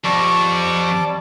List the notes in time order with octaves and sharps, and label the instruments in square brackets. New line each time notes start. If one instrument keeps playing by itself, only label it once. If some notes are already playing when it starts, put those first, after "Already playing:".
[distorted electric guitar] F2 [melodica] G3 A5 D6 [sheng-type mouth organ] C#6